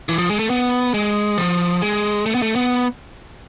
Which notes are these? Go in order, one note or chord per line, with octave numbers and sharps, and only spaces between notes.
E3
F3
G#3
A3
B3
G#3
F3
G#3
A3
B3
A3
B3